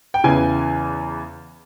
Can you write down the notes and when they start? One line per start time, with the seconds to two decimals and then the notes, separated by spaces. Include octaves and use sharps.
0.14 G5
0.24 E2 C#3 E3 G#5